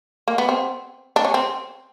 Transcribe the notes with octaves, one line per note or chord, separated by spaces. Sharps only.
A#3
B3
C4
D4
C#4
C4